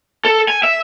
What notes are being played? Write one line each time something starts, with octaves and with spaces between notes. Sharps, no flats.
A4
G#5
E5